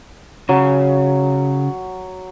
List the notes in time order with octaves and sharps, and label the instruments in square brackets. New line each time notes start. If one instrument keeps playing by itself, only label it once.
[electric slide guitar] C#3 [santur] F#3